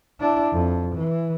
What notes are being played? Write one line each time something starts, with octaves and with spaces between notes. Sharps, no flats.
D4 E4
F2
E3